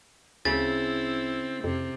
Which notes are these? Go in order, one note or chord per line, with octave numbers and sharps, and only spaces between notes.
D2 C#3 C4 E4 A6
F2 C3